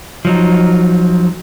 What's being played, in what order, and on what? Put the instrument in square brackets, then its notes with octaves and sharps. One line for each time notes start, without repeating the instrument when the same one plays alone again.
[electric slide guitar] F3 F#3 D#4